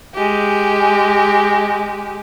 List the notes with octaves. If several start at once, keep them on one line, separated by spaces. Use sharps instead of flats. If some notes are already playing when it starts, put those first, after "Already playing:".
G#3 G4